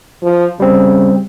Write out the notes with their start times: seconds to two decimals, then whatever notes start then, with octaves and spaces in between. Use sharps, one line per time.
0.22 F3
0.60 C#3 G3 C4